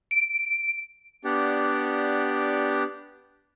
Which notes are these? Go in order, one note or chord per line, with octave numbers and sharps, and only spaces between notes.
D7
B3 D4 G4 D5 F#5